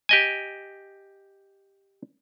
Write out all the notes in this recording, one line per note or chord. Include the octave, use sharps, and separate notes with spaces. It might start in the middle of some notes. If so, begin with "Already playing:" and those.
G4 D#5 G#5